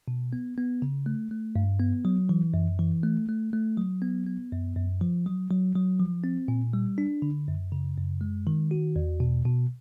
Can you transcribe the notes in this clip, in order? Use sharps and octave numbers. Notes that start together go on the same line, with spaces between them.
B2
B3
B3
C#3
A3
A3
G2
B3
F#3
E3
F#2
E3
A3
A3
A3
F#3
B3
B3
F#2
F#2
F3
F#3
F#3
F#3
F3
C4
A#2
G3
D4
D3
F#2
C#3
F#2
G#3
D#3
F#4
E2
B2
B2